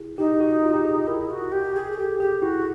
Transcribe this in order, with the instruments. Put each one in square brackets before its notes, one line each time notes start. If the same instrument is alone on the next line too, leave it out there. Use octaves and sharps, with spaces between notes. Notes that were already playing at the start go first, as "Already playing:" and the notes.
Already playing: [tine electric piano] E4 G#4
[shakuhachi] D#4 [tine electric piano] G4
[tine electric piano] F#4
F4
G4
G#4
[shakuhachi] E4 [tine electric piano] A#4
[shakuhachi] F#4
G4
G#4
G#4
[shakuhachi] G4 [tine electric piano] A4
[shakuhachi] G4 [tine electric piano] G#4
[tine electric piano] E4 [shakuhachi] F#4